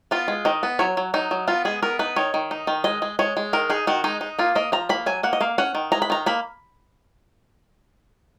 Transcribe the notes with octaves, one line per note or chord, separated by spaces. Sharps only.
B3 F4
G#3
D#3 D#5
B3
F#3 C#5
F#3
F#3 D#4
F#3
B3 F4
G#3 G#4
B3 A#4
D#4 B4
D#3 C#5
D#3
D#4
D#3
G#3 D#5
G#3
G#3 C#5
G#3
D#3 A#4
D#4 G#4
D#3 F#4
G#3 D#4
D#4
A#3 F4
A#3 D#5
F3 A#5
A#3 B5
F#3 G#5
A#3 F#5
D#5
A#3 F5
C#4 F#5
D#3
G#3 A#5
B5
D#3 A#5
A#3 B5